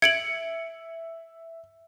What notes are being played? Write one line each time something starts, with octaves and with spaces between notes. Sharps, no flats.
E5 G#6 C#7 D7 F#7